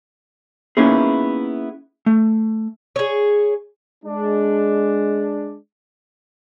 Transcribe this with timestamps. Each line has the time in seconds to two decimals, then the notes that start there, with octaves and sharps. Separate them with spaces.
0.77 A#3 B3 C#4 D#4 E4 G#4
2.06 A3
2.96 G#4 C#5
4.04 G#3 D4